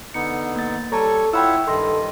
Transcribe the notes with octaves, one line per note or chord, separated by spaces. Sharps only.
D3 B3 D#4 C#7
A#3 A6
G3 A4 C#5 A5 A#5 C#6
E4 F4 C#5 F#5 G5 B5 E6
G2 D#3 A4 D#5 C6